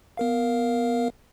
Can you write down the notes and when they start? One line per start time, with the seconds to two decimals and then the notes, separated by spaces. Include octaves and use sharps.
0.17 B3 A#4 F5